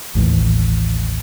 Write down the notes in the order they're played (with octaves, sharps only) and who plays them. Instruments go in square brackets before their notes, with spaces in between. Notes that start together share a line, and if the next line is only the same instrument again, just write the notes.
[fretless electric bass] A1 D#2 A2 E3